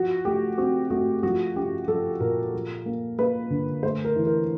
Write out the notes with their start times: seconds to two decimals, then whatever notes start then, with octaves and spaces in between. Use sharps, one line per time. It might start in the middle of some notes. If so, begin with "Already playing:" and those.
Already playing: F3 F#4
0.25 A3 G4
0.58 C4 F#4
0.90 A3 F#4
1.23 F3 F#4
1.56 C#4 G4
1.88 F3 A4
2.20 A#2 A#4
2.53 F3
2.86 A#3
3.19 A#3 B4
3.50 D3
3.83 A3 C5
4.05 A#4
4.16 E3
4.27 A#4